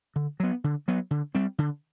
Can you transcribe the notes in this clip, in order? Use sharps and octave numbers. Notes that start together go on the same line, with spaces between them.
D3
F#3 B3
D3
F#3 B3
D3
G3 C4
D3